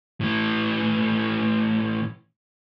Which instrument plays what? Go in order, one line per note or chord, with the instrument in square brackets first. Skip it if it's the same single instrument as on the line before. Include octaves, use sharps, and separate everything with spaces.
[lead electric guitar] A2 E3